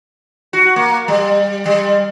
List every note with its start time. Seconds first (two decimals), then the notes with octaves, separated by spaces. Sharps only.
0.53 F#4
0.76 A#3
1.08 G3
1.66 G3